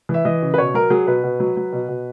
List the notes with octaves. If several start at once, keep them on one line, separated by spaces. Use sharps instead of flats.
E3
E5
E3 D#5
C#3
B4
B2 C#5
F#3 A#4
F#3 G#4
B2 B4
B2
F#3
F#3
B2
B2